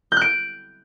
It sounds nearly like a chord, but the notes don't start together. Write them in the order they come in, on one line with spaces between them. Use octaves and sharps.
G6 F#6 D7